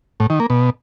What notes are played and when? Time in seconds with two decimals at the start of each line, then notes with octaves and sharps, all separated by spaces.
0.20 A2
0.30 D#3
0.40 A#3
0.50 B2